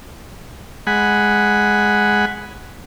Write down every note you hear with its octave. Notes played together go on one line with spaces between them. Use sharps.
G#3 F#5 G#5 B5